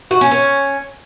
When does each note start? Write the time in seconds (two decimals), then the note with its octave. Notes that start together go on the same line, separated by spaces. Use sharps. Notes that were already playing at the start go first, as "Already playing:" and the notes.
0.11 F#4
0.21 C#4
0.31 C#4